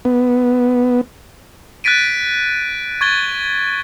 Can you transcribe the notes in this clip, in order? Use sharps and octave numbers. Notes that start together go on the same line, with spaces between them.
B3
F#6 G#6 A6 B6 D7 D#7
C#6 G#6 A6 G7